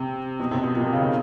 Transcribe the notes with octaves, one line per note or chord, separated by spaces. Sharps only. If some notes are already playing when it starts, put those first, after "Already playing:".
Already playing: C3
B2
C3
B2
A#2
B2
C#3
D#3